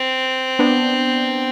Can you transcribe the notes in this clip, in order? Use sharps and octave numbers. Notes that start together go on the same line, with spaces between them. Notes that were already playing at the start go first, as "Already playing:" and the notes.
Already playing: C4
B3 D4